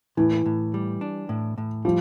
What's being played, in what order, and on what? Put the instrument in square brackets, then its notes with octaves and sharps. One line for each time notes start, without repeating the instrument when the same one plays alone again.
[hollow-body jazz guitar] A2 [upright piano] E3
[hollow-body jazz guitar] A2
G3
D4
A2
A2
[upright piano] F3 [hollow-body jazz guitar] G3